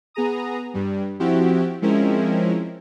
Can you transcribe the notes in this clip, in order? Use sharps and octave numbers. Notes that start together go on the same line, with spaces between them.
B3 G#4 A#5 D#6
G2 G3
F3 C4 E4 F#4 G4
F3 G#3 C4 C#4 E4 A#4